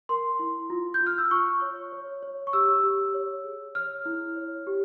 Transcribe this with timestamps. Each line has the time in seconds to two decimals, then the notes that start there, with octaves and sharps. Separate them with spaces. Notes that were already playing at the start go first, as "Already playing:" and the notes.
0.09 A#4 C6
0.39 E4
0.70 F4
0.94 G6
1.01 F4
1.07 F6
1.18 E6
1.31 F4 C#6
1.62 C#5
1.92 C#5
2.23 C#5
2.47 C#6
2.53 G4 E6
2.83 G4
3.14 C#5
3.44 G#4
3.75 C#5 F6
4.06 E4
4.36 C#5
4.67 G4